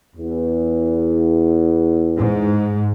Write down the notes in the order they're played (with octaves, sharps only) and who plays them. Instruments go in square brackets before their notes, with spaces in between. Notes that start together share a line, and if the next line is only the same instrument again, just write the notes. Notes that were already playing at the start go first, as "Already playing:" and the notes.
[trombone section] E2
[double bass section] G#2